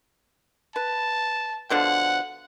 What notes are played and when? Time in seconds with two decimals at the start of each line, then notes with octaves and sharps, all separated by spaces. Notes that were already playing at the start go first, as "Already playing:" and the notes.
0.76 B4 A5
1.70 B2 D3 F3 F#5